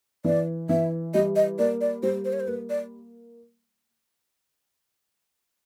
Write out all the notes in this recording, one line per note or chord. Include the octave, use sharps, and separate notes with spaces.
E3 D5
E3 E5
G3 D#5
D#5
A#3 D5
D5
G3 C5
C5
C#5
C5
A#3 B4
D5